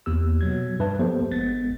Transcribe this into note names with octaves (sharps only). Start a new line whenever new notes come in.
E2 A#3 G4 E6
B2 F#3 G#6
G2 B4 E5 A5
F3 A#3 B3 G4 A4 C5
G#1 G#3 B3 A6